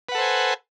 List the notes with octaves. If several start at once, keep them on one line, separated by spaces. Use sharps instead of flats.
A4 B4 C5 F#5 G#5